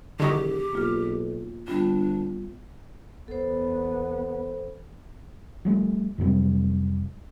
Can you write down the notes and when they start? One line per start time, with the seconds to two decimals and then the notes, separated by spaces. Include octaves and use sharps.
0.20 E1 D3 D#3 F#3 G4 G#4 C#6 D#6
0.73 B1 A#3 F4 F6
1.68 G1 G3 B3 D4 F4
3.28 E2 B3 A4 C5
5.65 F3 G3 A3
6.18 F2 C3 F#3 G3